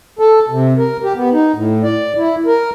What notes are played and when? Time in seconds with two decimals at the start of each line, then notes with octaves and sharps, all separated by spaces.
0.19 A4
0.49 C3
0.77 A#4
1.04 G4
1.16 B3
1.32 D#4
1.55 A2
1.84 D5
2.17 E4
2.46 A#4